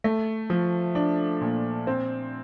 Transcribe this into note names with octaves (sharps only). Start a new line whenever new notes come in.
A3
F3
D4
A#2
C4